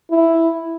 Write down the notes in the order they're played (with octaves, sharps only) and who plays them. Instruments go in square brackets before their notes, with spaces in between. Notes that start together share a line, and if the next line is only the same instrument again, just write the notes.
[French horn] E4